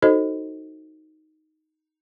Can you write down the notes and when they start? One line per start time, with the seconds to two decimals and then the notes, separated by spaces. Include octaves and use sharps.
0.02 D#4 F#4 A4 C5 D#5